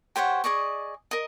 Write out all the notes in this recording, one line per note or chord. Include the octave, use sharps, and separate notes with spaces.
G4 C5 C#5 F#5
G#4 D5 D#5 C#6
A#4 D#5